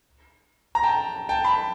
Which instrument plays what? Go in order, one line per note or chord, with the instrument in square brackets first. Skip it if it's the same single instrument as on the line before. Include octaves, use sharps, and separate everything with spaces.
[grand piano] A#5
G5 A5
G5 A5
A5 B5